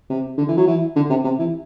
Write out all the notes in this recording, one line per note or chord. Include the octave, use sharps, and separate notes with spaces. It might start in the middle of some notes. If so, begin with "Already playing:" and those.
C3
D3
E3
F#3
E3
D3
C3
C3
E3